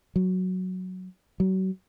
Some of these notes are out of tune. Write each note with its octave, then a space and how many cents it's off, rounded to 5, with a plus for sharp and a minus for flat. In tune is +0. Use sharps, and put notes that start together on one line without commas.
F#3 +0
F#3 +35